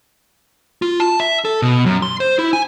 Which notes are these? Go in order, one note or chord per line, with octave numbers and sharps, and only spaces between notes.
F4
A5
E5
A4
B2
F#2
C6
C5
E4
G#5